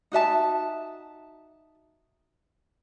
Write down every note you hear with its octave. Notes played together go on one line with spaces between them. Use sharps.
D#4 F#4 E5 A5